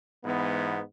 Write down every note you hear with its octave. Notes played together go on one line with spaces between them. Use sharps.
G#2 E3 B3